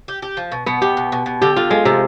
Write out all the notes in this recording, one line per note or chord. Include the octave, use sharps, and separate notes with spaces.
G4
G4
F3
B2
B2 B3
B2 G4
B2
B2
B2
D3 G4
D3 F4
F3 G#3
C3 F3